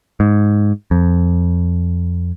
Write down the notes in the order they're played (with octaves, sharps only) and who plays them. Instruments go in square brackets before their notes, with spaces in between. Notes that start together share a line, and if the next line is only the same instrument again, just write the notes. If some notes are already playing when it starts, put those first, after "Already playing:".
[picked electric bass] G#2
F2